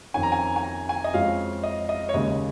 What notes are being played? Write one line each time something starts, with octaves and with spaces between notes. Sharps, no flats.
F2 D#3 C#4 G#5
A#5
G#5
G#5
A#5
G#5
D#5
F2 F3 G#3 C#4 F5
D#5
D#5
C#5
D#2 C#3 G#3 C#4 D#5